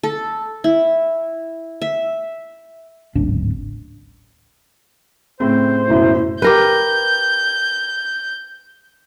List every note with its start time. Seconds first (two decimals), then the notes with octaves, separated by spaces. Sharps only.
0.03 A4
0.64 E4
1.82 E5
3.15 D1 G#1 C#3 D4
5.40 A2 C#3 C4 C5
5.89 F#1 F#2 B2 E4
6.42 G4 A#4 B4 G6